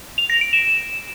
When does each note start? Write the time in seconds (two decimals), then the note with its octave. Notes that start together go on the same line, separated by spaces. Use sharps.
0.18 F7
0.30 A#6
0.41 D7
0.53 E7